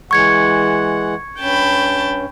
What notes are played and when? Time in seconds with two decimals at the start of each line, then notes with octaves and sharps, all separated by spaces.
0.11 E3 G#3 F#5 C#6 G#6 C#7
1.40 G2 C#4 G5 A5 B5